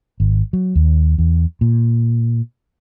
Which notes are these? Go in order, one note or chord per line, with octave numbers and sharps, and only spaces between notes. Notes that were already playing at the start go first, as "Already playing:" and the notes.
G#1
F#3
D#2
E2
A#2